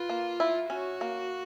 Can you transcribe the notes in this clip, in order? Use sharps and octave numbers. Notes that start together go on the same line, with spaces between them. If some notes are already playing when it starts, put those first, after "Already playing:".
Already playing: F4 B4
A#3
E4
C#4 F#4
A#3